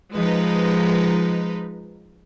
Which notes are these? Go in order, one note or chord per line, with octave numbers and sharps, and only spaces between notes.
F3 G#3 D#4 B4